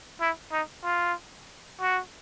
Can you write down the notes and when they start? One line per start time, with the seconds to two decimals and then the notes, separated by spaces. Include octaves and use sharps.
0.21 E4
0.52 D#4
0.84 F4
1.81 F#4